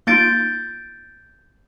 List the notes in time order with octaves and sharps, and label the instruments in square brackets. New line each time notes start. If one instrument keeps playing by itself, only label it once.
[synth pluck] A#3 D#4 F4 [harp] G6 A6 D7